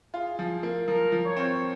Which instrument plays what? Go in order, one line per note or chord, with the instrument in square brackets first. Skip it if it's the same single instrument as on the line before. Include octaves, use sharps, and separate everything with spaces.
[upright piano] F4 [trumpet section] G#4
[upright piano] F3
A#3
[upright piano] F3 [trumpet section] A#4
[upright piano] F3
[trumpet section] C#5
[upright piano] C4